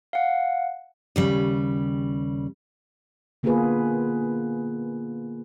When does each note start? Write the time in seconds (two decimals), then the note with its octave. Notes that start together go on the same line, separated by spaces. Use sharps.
0.13 F5 F#5
1.16 D#2 C#3 G3
3.43 D3 A#3 B3 F4 G#4 B4